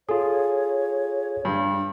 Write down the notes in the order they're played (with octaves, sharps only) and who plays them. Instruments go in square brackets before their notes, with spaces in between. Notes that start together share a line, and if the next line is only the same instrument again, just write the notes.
[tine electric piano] F4 G#4 [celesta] A4 [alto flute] C#5
[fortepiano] G2 [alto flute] D4